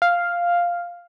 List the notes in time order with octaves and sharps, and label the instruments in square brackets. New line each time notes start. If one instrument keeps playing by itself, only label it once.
[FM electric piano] F5